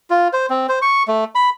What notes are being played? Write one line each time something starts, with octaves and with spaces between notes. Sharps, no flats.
F4
C5
C4
C5
C#6
A3
B5